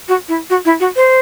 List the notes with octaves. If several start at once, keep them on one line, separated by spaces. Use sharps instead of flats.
F#4
E4
F#4
E4
F#4
C5